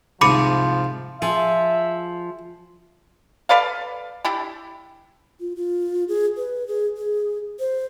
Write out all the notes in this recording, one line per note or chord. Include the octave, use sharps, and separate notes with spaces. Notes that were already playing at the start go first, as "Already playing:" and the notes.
C2 G#2 F3 B5 D6 D#6 C#7
F3 G#4 E5
A4 B4 D5 F5
D4 E4 G4
F4
F4
G#4
B4
G#4
G#4
C5